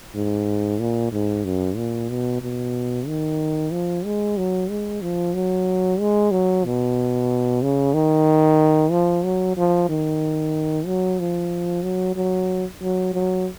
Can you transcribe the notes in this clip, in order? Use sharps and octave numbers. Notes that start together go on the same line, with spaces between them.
G#2
A#2
G#2
F#2
A#2
B2
B2
D#3
F3
G#3
F#3
G#3
F3
F#3
G#3
F#3
B2
C#3
D#3
F3
F#3
F3
D#3
F#3
F3
F#3
F#3
F#3
F#3